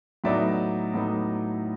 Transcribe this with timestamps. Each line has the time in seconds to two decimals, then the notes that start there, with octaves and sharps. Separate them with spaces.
0.24 A2 F#3 B3 D#4 D5 E5
0.94 A2 F#3 B3 D#4